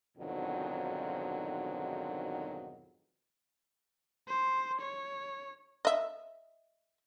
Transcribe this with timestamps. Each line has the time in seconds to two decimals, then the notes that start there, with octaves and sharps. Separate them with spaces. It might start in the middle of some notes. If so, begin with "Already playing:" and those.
0.17 F2 G#2 B2 D3 D#3 F#3
4.28 C5
4.80 C#5
5.85 D#5 E5